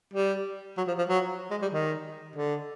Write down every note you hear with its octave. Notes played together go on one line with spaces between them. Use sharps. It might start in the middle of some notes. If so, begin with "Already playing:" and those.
G3
F#3
F3
F3
F#3
G#3
G3
D#3
D3